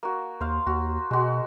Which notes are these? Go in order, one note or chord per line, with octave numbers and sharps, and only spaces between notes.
A#3 F#4
D#2 C5 F5
D#2 F#4
B2 G#3 F#4